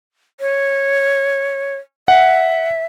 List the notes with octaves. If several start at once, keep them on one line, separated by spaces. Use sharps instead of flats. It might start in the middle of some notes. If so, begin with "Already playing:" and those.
C#5
E5 F#5